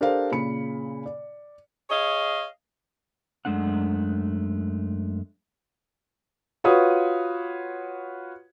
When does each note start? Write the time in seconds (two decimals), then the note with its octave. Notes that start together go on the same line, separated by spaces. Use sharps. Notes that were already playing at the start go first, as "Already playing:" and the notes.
0.01 D4 G4 A4 A#4 C5 F5
0.32 A#2 C#3 B5 C#7
1.06 D5
1.90 G#4 C#5 D#5 F5
3.45 F#2 G#3 A3 D4 F#5
6.64 F4 F#4 B4 C#5 D#6